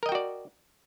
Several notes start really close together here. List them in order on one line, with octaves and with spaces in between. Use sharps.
A#4 D#5 G5 F#4 D5